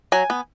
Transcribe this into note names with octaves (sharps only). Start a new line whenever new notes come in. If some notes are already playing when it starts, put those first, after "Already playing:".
F#3 G#5
B3